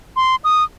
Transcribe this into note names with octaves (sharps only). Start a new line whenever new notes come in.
C6
D#6